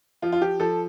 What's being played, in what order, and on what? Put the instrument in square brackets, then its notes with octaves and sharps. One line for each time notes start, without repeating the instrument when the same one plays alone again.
[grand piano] F3 F4
F4
G4
F3 A4